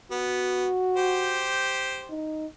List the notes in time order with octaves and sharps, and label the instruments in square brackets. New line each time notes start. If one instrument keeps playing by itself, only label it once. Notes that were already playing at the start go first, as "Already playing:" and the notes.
[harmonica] B3 [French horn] F#4
[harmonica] G4 C5
[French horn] D#4